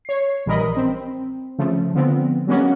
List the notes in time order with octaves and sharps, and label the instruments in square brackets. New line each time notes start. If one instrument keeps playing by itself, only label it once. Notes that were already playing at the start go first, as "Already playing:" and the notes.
[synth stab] C#5 C7
A#1 E3 G3 A#4 D#5 B5
C4
C#3 F3 A3
D3 F3 B3 C4
F#3 G#3 A#3 B3 C#4 F#4